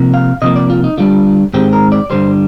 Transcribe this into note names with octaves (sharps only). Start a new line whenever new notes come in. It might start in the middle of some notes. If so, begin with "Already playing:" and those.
Already playing: C3 F3 A#3
F5
C3 F3 A#3 D#5
D5
F4
D#4
D3 G3 D4 F4
G#2 D#3 G#3 C4 G4
A#4
D5
G2 D3 G3 C5